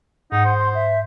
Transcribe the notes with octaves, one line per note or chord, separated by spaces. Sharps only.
G#2 D#4 F#5
C5
C6
E5